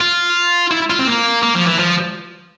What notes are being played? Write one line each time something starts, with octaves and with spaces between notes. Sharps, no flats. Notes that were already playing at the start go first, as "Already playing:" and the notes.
F4
E4
F4
C4
A#3
A#3
F3
E3
F3